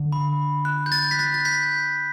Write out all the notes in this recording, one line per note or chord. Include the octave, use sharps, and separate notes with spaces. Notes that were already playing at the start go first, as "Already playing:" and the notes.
Already playing: D3
B5
F#6
G6
F#6 A6
B6
F#6 A6
A6
G6 B6